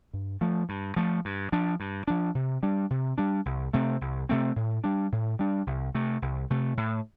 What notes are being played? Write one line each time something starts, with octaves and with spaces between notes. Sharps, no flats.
G2
F3 A3
G2
F3 A3
G2
F3 D4
G2
F3 D4
C3
G3 D4
C3
G3 D4
C2
C3 A3 C4
C2
C3 A3 C4
A2
G3 D4
A2
G3 D4
C2
C3 A3
C2
C3 A3
A2